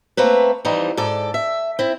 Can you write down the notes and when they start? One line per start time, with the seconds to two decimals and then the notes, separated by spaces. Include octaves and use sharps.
0.17 A3 A#3 C4 B4
0.65 E3 F3 G3 C4 D#4
0.97 G#2 A4 D5
1.34 E5
1.79 C4 E4